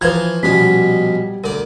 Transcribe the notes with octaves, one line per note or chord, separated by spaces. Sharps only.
E3 F3 B4 A#5 G#6
A#1 B2 G3 C#4 B6
D2 A#4 D5